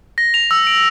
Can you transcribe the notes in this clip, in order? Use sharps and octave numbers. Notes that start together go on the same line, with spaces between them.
A#6
F7
E6
D7